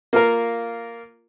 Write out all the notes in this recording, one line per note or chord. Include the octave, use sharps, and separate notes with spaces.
A#3 F4 A#4